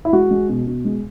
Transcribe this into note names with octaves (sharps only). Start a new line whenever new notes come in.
E4
G#3 F#4
G#3
B2
B2
G#3